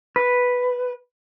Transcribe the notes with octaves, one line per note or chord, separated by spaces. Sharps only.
B4